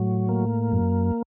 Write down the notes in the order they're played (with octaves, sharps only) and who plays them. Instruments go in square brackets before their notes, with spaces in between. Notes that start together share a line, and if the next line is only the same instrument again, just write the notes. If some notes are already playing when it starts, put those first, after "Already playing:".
Already playing: [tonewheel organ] A2 F#3
A#3
F#2